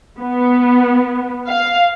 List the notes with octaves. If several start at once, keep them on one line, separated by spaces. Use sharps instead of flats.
B3
F5